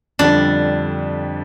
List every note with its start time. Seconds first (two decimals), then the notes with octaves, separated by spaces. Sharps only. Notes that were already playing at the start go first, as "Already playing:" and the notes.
0.19 F2 D3 G3 D4